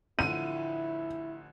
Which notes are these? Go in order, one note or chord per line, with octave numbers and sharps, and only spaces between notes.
A1 D3 F3 E4 D#7